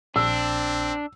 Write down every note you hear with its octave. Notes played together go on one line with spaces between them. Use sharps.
A#1 C4 D4 E6